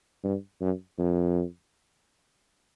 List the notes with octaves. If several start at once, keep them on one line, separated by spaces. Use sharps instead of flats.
G2
F#2
F2